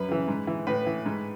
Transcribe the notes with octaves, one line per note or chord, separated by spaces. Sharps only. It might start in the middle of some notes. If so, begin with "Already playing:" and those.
Already playing: F#2 B4
C#3 E3
G#2
E3
A2 B4
E3
G#2